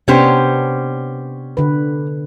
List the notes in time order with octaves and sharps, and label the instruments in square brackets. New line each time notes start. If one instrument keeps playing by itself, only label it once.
[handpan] C3 B3 D4 [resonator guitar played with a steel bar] C#4 G4 C5
[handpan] D3 B4